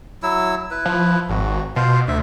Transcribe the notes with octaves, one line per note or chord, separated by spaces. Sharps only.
F#3 E4 E6
E4 B4
F3
G#1 F#4
B2 F4 C5 F5
D2 E5